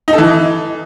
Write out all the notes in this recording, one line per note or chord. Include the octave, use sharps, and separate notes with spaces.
D#4
A4
E3